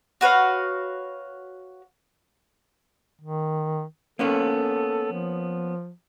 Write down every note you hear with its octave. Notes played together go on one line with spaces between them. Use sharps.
F#4 B4 C#5 F5
D#3
A#3 B3 C#4 A4
F3